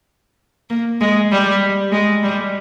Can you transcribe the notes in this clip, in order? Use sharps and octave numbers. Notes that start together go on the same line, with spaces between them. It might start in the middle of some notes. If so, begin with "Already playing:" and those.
A#3
G#3
G3
G#3
G3